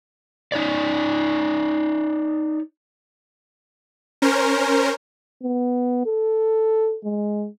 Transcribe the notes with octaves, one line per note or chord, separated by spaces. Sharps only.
D#4 C#5 D5
C#4 A#4 C5
B3
A4
G#3